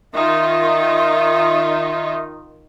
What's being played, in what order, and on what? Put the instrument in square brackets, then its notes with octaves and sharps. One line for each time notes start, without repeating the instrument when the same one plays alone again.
[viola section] D#3 D#4 F4 [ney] E5